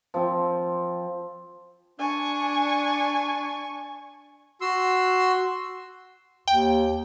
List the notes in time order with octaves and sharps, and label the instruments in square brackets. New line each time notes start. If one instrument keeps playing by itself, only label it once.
[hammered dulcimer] F3 C4
[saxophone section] D4 [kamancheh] G#5 C#6
[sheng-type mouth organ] F#4 C6 E6
[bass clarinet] D#2 [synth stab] G5